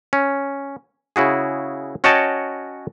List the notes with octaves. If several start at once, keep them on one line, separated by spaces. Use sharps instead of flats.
C#4
C#3 E4 F#4 G#4
C#4 F#4 C#5 D#5 G5 A5